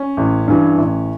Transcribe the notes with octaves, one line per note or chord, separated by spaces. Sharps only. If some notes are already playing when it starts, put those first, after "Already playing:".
Already playing: C#4
A1
G2 E3
A1